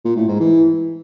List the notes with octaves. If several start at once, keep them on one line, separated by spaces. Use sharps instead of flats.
A#2
A2
G#2
E3